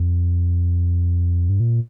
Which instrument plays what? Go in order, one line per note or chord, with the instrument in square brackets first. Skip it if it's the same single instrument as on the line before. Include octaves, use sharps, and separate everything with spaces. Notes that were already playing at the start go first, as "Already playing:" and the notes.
Already playing: [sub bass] F2
G2
A#2